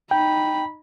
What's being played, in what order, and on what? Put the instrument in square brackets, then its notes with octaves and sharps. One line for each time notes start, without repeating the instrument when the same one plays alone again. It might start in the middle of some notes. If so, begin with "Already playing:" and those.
[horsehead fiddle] D#4 B5 [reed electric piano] G5